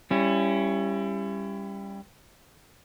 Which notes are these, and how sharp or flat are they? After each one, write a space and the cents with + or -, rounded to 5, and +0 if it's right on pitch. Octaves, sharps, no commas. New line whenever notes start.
G3 +15 C#4 +0 E4 +35